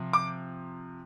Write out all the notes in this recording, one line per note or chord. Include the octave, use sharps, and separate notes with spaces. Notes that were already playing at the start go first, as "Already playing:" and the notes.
Already playing: C3 F3
D6